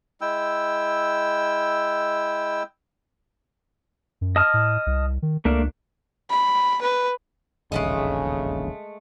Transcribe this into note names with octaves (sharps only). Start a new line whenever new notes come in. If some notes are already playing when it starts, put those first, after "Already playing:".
G#3 E4 G5 E6
F#2
D#5 A5 F6
A2
C2
D#3
C#2 A3 A#3 D4
B5
B4
E1 A#1 D#2 C#3 G#3 A3 D#5